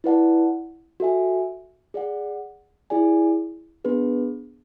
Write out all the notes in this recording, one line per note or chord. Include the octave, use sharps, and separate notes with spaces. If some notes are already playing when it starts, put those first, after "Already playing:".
E4 B4 D5 F#5 A5
F#4 A4 E5 G#5
G#4 D5 F#5
E4 G#4 D5 G#5
B3 D4 G#4 B4